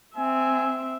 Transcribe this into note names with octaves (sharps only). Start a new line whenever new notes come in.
C4 E5 G#5